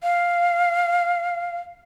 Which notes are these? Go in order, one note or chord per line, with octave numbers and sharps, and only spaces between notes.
F5